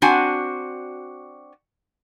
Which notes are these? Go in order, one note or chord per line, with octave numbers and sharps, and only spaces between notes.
C4 D4 F#4 G#5 A5